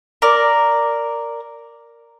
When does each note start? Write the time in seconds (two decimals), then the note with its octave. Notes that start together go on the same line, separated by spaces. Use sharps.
0.22 A#4 D5